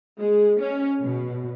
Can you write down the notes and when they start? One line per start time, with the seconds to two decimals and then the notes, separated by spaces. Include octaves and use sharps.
0.19 G#3
0.60 C#4
1.03 B2